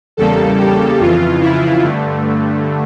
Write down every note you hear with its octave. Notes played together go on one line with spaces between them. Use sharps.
E2 C#3 G3 A#3 A4
G4
F2 C#3 E3 F4
E4
G2 D3 A3